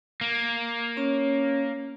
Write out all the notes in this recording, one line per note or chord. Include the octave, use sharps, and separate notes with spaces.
A#3
C#4 C#5